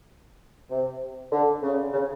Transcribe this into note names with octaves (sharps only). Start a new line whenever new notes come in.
C3
D3
C#3
C#3